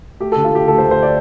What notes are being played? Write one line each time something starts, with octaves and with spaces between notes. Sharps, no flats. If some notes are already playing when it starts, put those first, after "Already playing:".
A3 G4
D3 A4
F4
A3 G4
D2 A4
C5
D2
C5
D5